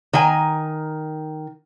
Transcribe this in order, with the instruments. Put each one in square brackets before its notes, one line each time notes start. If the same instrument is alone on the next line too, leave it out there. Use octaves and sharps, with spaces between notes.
[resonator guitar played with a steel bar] D#3 G#5 A#5